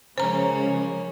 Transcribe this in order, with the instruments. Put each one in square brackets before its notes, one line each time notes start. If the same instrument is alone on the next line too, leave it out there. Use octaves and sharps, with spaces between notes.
[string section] C#3 F3 G#3 [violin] A#3 C#4 [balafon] C5 A#5